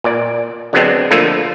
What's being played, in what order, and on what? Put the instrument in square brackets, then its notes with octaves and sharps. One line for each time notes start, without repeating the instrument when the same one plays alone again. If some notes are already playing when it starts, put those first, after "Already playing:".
[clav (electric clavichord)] A#2 D5
D3 F#3 G#3 B3 C4 D4
D3 F3 A3 A#3 F4 A4